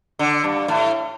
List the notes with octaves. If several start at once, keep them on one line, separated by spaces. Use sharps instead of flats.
D3
G2
A2